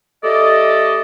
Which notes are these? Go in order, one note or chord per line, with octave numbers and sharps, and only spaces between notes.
A3 G4 A4 D5 D#5